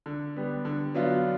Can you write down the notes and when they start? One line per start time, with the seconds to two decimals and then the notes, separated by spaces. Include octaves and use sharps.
0.06 D3
0.36 G3 B3
0.65 D3
0.94 F#3 B3 D4 F4